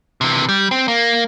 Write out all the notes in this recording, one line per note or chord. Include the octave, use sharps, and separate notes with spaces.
C3 E3
G3
C4
A#3